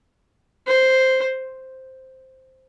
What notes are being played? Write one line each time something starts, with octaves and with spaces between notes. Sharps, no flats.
C5